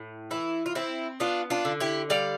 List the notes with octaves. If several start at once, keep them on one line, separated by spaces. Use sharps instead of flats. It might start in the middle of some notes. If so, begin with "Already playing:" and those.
Already playing: A2
E3 E4
F4
C4 E4
B3 D4 F4
D4 F4
D3
E4 G4
G3 D5 F5